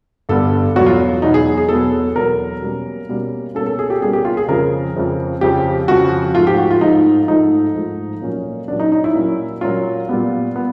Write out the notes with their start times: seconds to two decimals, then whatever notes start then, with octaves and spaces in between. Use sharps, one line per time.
0.29 G2 D3 G3 B3 A4
0.75 E2 B2 F#3 B3 F#4
0.86 F4
1.22 E2 B2 F#3 B3 D#4
1.34 G#4
1.58 G#4
1.69 E2 B2 F#3 B3 A4
2.15 E2 B2 F#3 B3 A#4
2.62 B2 G3 A#3 C#4
3.09 B2 G3 A#3 C#4
3.55 B2 G3 A#3 C#4 A4
3.67 A4
3.79 G#4
3.90 G4
4.02 B2 G3 A#3 C#4 G#4
4.13 G4
4.25 F4
4.37 G#4
4.48 F2 C#3 F3 A#4
4.96 F2 C#3 F3
5.41 F2 C#3 F3 G4
5.88 F2 C#3 F3 F#4
6.35 G#2 F3 A3 F4
6.47 G4
6.58 F#4
6.71 F4
6.81 G#2 F3 A3 D#4
7.28 G#2 F3 A3 D#4
7.75 G#2 F3 A3
8.21 A#2 F#3 A#3 C#4
8.68 A#2 F#3 A#3 C#4 D4
8.80 D#4
8.92 D#4
9.04 E4
9.15 A#2 F#3 A#3 C#4
9.61 A#2 F#3 A#3 C#4 F4
10.09 A#2 G3 B3
10.56 B3